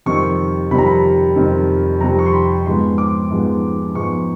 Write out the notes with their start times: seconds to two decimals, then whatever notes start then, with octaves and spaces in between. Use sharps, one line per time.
0.06 F2 C3 D#3 G3 C4 C#6
0.71 F2 C3 D#3 G3 C4 B5
0.78 A#5
0.87 B5
1.36 F2 C3 D#3 G3 C4
2.01 F2 C3 D#3 G3 C4 A#5
2.19 C#6
2.26 C6
2.33 B5
2.66 G#2 F3 G#3 B3 C6
2.98 D6
3.31 G#2 F3 G#3 B3
3.95 G#2 F3 G#3 B3 C#6